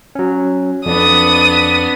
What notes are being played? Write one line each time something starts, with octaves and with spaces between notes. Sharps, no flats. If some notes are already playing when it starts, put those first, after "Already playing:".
F#3 C#4
F2 B3 D4 D#6